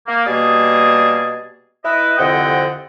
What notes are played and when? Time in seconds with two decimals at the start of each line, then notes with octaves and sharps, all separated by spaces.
0.07 A#3
0.26 B2 G3 A#3 G#4 A5 D#6
1.84 E4 B4 D#5
2.18 C2 F2 D3 D#5 F#5 G5